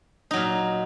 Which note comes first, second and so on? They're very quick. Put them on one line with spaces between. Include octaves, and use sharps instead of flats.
D#4 F#3 A#2